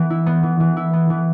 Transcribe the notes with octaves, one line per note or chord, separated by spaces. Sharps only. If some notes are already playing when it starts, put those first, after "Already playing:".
Already playing: E3 B3
E4
B3
E3
E3
E4
B3
E3